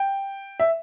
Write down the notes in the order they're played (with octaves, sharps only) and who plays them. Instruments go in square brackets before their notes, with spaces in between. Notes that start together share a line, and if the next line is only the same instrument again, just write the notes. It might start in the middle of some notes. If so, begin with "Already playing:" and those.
Already playing: [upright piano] G5
E5